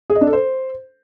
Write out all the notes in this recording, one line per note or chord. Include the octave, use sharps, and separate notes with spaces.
G#4
D#5
D4
A4
C5